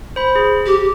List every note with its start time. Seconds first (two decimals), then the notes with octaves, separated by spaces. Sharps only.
0.16 C5 B5
0.36 G#4
0.66 G4